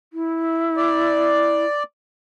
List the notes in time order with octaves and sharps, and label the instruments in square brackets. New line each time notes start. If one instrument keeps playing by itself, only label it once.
[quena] E4
[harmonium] D5